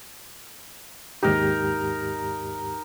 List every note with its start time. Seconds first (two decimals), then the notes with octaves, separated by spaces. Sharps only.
1.23 D#2 G#2 D#4 G4 A#4